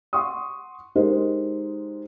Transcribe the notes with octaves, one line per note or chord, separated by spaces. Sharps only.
F#5 C6 C#6 D#6
G#3 D#4 G4 A#4 C5 D#5